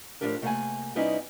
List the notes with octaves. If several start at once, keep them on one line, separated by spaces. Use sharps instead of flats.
A2 F3 D4 G4 A#4
C3 A3 A#3 A4 F#5 G#5
C3 G3 B3 C#4 D#4 E4